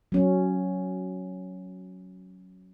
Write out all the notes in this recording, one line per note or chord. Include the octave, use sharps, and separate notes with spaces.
F#3 C#4